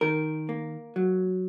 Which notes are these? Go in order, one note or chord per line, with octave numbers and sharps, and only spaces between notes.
D#3 A#4
A#3
F#3